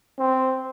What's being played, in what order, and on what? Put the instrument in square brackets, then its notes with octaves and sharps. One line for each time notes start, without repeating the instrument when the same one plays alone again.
[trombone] C4